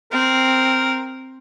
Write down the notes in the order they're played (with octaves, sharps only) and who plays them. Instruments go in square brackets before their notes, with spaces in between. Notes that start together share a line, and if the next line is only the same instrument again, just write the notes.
[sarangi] C4 [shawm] A#4